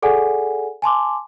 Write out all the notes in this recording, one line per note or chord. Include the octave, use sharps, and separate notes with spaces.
G#4 A4 D5 F#5 G#5
G#5 A5 C6 D6